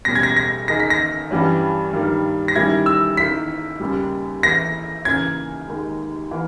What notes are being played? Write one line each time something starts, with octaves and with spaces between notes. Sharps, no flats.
B2 G3 A#3 C#4 A#6
G#6
A#6
A#6
D#3 A#3 D#4 G#4 D#5 A#6
B6
A#6
G2 E3 G3 C#4
G2 D#3 G3 A#3
A#6
D#3 G3 C#4 E4 G#6
E6
D#3 A#3 E4 A#4 B6
D#2 C#3 G3
E3 A#3 E4 A#6
D#2 C#3 E3 A#3 C#4 G#6
D#2 D#3 G#3
E3 A#3